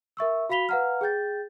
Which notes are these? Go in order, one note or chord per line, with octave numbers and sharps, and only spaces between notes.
A#4 E5 C#6 E6
F#4 F5 B5 B6 F7 G7
B4 F5 F#5 A#5 F6
G#4 G5 G6 A6